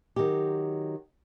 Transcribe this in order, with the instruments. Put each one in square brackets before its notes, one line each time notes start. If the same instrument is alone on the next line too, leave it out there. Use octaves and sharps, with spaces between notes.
[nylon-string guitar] D#3 F#3 F#4 G4